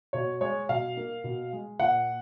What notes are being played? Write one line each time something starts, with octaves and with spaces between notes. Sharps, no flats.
B2 C#5
G#3 C#5
B2 F5
A#3
B2
G#3
A#2 F#5